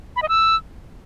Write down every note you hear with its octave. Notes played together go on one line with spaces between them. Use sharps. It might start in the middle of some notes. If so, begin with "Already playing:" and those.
B5
D#5
E6